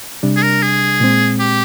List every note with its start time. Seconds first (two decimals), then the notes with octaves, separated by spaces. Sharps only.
0.23 C3 G3 D4
0.36 G#4
0.42 A#4
0.62 G#4
1.00 A#2 G#3 C4
1.40 G4